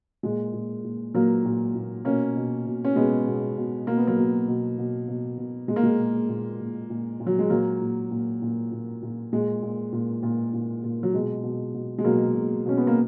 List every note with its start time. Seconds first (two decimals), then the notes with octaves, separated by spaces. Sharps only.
0.23 A#2 G#3
0.53 A#2
0.84 A#2
1.14 A#2 F#3 A#3
1.45 A#2
1.75 A#2
2.05 B2 A#3 C#4
2.36 B2
2.66 B2
2.85 C#4
2.96 B2 G#3 B3
3.26 B2
3.57 B2
3.87 B2 A#3
3.97 B3
4.07 F#3 A#3
4.17 B2
4.48 B2
4.78 B2
5.08 B2
5.38 B2
5.68 A#2 G#3
5.76 A#3
5.83 G#3
5.99 A#2
6.29 A#2
6.60 A#2
6.90 A#2
7.20 A#2
7.27 F#3
7.39 G#3
7.50 A#2 F#3 A#3
7.81 A#2
8.11 A#2
8.42 A#2
8.72 A#2
9.02 A#2
9.33 A#2 G#3
9.62 A#2
9.92 A#2
10.23 A#2
10.53 A#2
10.84 A#2
11.03 F#3
11.14 B2 G#3
11.44 B2
11.74 B2
11.98 G#3
12.05 B2 F#3 A#3
12.35 B2
12.66 B2 C#4
12.77 B3
12.87 A#3